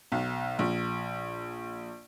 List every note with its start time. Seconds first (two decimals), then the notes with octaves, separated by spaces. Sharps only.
0.12 B1
0.59 A#1